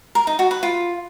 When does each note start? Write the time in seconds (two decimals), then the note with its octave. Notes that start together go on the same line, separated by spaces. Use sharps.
0.15 A#4
0.27 D#4
0.39 F#4
0.51 B4
0.63 F4